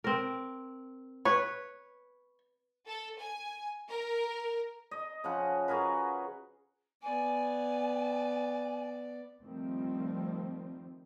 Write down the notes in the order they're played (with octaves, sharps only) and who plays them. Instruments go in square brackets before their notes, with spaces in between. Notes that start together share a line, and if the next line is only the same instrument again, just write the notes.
[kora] C4 A#4
[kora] B4 [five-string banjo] C#5
[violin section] A4
G#5
A#4
[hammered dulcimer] D#5
C#3 F3 F#5
F#4 G#4 A#4 B4
[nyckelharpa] B3 D5 [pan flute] G#5
[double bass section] D#3 F3 G3 A3 C4